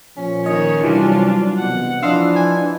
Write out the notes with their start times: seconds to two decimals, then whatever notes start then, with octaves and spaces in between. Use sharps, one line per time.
0.17 A#2 F3 C#4
0.46 D#3 C#5 D#5
0.83 C3 E3 F#3 G3 D4 F4
1.59 C2 B2 F#5
2.03 E3 F3 D4 D#5 F5 C6 E6
2.36 G#5